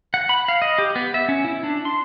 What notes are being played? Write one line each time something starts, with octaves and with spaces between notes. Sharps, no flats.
F#5
B5
F5
D#5
G4
B3
E5
C#4
E4
D4
C6